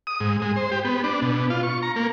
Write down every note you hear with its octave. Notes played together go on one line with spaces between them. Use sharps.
D#6
G#2
G#3
C5
G4
B3
D4
B2
F4
C#6
A#5
A#3